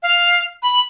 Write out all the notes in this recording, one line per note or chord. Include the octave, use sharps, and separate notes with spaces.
F5
B5